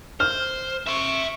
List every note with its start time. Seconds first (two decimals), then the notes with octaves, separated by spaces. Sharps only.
0.20 C5 F6
0.87 E5 C6 C#6